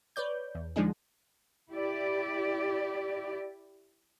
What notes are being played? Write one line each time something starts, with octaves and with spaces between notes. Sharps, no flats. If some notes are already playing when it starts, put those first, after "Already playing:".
B4 C#5 D5 G6
E2
D3 F3 G#3 D4 D#4 G#4
E4 G4 D5